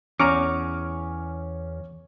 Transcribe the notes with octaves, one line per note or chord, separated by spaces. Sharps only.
E2 C#4 A#5 C#6 D6 F6 D#7